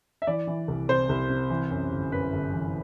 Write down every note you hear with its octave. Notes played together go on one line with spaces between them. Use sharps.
E5
E3 D5
E3
C2
C3 C5
C2
C3
E3
F#2
G1
F#2 B4
G1
E3